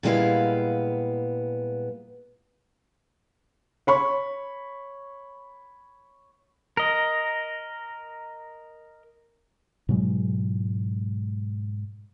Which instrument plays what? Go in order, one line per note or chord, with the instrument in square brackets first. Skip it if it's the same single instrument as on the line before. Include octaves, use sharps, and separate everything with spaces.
[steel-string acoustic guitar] A#2 G3 G#3 B3 E4 F5
[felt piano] C#5 B5 C#6
[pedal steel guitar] A#4 D#5
[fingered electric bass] G#2 B2 F#3 G#3